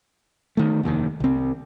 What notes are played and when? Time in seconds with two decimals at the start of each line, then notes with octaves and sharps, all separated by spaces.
0.57 D#3 A3
0.83 F1 D#2 D#3
1.20 C2 C4